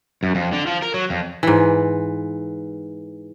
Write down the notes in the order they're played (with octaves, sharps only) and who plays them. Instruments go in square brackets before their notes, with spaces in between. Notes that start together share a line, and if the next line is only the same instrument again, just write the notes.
[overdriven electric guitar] F#2
F2
D3
F3
A#4
F#3
F2
[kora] G#2 E3